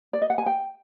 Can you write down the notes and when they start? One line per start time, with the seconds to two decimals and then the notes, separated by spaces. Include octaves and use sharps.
0.13 D5
0.22 D#5
0.30 F#5
0.38 G#5
0.46 G5